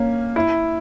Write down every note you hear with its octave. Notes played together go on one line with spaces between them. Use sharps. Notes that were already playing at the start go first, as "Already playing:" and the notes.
Already playing: A#3 C#4
E4